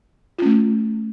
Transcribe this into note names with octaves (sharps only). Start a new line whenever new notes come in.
A3 C#4 F4